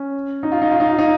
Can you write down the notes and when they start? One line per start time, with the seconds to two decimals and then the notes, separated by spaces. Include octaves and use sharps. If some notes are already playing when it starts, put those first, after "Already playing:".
Already playing: C#4
0.43 D#4
0.52 F4
0.62 D#4
0.71 F4
0.80 D#4
0.89 F4
0.98 D#4